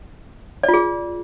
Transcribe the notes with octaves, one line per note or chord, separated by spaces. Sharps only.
D5
F4
G#4